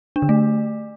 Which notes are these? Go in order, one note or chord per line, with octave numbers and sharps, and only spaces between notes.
D4
D3
A3